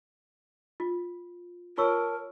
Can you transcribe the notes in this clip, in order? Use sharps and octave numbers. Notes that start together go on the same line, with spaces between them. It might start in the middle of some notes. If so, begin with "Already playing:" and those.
F4
F4 A#4 C#5 A5 C#6 E6